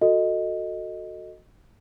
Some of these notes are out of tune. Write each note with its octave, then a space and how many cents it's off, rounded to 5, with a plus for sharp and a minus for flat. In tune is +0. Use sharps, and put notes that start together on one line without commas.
F#4 -15 A4 +10 D#5 +0